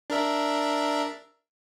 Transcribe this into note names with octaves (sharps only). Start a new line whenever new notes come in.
D4 A#4 E5